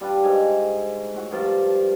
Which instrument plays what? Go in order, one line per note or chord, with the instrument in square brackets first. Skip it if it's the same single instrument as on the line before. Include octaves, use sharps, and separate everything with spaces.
[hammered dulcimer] G3 D4 F4 B4
G#2 D#5 G#5 A#5
A2 F#4
G2 F3 A#4 A5